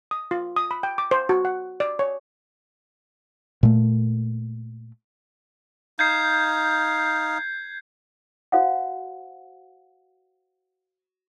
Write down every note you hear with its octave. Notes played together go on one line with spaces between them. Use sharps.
D#6
F4
D#6
B5
G5
D6
C5
F#4
F#5
D5
C#5
A#2 A3
D#4 F5 G6 G#6 C7
F#4 C5 F5 F#5